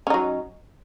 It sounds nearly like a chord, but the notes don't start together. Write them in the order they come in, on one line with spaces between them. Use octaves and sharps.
C#4 D#4 F#3